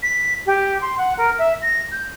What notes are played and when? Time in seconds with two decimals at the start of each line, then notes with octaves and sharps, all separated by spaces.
0.03 B6
0.46 G4
0.81 C6
0.97 F#5
1.17 A#4
1.38 E5
1.61 A#6
1.91 G6